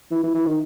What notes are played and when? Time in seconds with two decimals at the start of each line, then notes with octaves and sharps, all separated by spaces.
0.11 E3
0.23 E3
0.34 E3
0.46 D#3